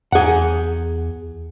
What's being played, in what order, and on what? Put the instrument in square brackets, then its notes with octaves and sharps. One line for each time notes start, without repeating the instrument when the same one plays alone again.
[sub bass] E2 [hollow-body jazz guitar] G#4 F#5